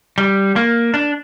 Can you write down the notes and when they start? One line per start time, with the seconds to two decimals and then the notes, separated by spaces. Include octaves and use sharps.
0.18 G3
0.56 A#3
0.94 D4